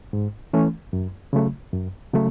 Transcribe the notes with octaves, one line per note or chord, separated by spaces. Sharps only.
G#2
E3 A3 C#4
F#2
C#3 F#3 A3
F#2
C#3 F#3 A3